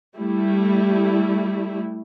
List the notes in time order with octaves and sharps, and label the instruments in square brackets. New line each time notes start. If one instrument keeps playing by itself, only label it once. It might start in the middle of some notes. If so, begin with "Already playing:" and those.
[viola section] G3 A3 E4